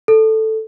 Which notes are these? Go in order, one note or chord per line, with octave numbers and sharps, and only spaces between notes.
A4